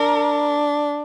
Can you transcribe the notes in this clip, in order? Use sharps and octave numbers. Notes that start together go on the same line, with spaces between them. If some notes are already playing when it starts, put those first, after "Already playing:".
Already playing: D4 A#4